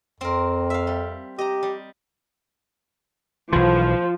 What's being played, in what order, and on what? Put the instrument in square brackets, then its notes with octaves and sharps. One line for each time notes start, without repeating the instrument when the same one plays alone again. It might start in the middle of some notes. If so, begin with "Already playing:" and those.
[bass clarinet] F2 [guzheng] C4 A#4
[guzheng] E5 F5
G3
[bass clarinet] G4 [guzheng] D#5 A#5
[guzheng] G3
[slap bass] B1 E3 [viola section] F3 [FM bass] F4